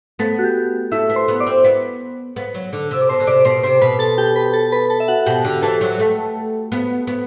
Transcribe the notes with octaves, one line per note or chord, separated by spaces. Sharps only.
A3 B3 A4
F#4
G4
A3 E4 E5
B3
C5 C6
B3
D5 D6
C4
B3
B3
F#3
D3
C3 E6
D6
B2 C5 C6
D3
C3 D5 D6
B2 C5 C6
C3 C5 C6
B2 B4 B5
A4 A5
G4 G5
B4 B5
A4 A5
B4 B5
A4 A5
E5
F#4 F#5
F#5
B2 G4 G5
D3
E3 A4 A5
F#3
A3
B3
B3